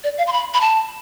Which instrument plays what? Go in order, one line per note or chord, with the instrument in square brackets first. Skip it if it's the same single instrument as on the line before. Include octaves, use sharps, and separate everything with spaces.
[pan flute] D5
F5
C6
B5
B5
A5